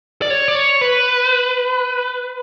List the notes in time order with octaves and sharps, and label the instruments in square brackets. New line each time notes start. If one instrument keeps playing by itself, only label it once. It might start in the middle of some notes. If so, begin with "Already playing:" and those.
[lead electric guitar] D5
C#5
D5
C#5
B4